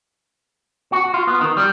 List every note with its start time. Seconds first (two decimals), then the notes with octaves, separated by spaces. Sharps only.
0.92 F#4
1.14 F4
1.27 B3
1.41 D#3
1.57 G3